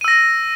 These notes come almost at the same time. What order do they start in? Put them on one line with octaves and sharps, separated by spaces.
D#7 E6 A#6